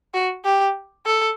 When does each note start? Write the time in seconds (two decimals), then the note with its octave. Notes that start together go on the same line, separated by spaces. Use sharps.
0.14 F#4
0.44 G4
1.05 A4